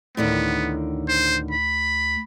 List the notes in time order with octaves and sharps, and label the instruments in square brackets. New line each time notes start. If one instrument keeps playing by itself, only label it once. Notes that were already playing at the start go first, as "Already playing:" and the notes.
[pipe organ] D2 [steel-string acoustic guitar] A2 D3 D#3 [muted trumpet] B3
[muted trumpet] C5
B5